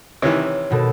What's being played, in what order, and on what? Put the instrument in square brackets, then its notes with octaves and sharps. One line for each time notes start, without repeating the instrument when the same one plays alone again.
[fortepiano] C3 D#3 E3 [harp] C#5
[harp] D#1 B2 A4